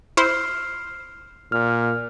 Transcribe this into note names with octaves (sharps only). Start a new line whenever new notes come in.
E4 C5 F6 C7
A#2 F6